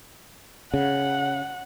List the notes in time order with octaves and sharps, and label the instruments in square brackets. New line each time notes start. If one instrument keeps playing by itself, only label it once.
[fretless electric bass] C#3 [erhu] F#5